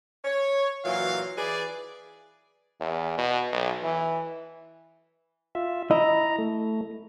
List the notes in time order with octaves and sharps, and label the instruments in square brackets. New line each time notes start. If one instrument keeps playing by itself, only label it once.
[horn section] C#5
A#2 E3 F#3 F5
E3 G#4 B4 D5
[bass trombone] E2
B2
B1
E3
[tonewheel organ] F4 E5
[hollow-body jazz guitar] E4 D#5 [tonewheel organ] A#5
[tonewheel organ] A3